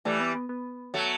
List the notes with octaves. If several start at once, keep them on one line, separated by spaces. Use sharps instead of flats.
E3 G3 A3
B3
B3
B3
F#3 A3